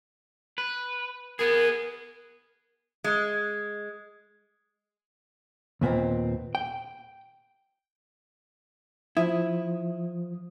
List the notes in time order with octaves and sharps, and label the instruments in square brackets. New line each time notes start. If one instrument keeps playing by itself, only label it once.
[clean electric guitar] B4
[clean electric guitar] B3 G#4 [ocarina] A#4
[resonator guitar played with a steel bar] G#3
[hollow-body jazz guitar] D#2 A#2 B3 C4
G5
[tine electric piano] F3 D#6 [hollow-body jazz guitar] E4